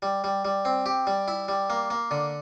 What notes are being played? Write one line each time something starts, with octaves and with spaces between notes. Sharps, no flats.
G3
G3
G3
C4
G4
G3
E4
G3
A#3
A#3
D3